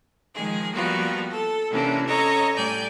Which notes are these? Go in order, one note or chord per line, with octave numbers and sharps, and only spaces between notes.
D#3 F3 G#3 G#4
F3 G3 A#3 B3 F4 F#4
A4
C3 E3 A#3 C#4 D4
C#4 A4 C#5 D#5 A#5
A2 G3 D5 G#5 G6